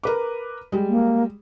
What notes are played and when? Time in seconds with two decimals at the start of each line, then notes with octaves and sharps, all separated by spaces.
0.03 A#4 B4 D6
0.72 G3 G#3
0.89 A#3